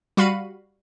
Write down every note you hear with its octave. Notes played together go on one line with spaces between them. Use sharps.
G3 F#4 F5 B5 C#7 D#7